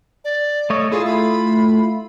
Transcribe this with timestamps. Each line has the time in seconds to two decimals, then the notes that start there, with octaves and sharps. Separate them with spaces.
0.24 D5
0.70 A3 C#5 D#5
0.92 A3 E4 F4 G#4
1.07 B5